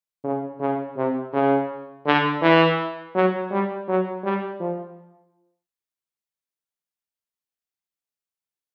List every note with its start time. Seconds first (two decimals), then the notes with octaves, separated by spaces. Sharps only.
0.24 C#3
0.60 C#3
0.97 C3
1.33 C#3
2.06 D3
2.42 E3
3.15 F#3
3.51 G3
3.88 F#3
4.24 G3
4.60 F3